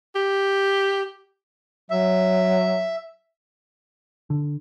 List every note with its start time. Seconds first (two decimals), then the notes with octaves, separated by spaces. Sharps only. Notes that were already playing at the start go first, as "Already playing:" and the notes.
0.15 G4
1.91 F#3 E5
4.30 D3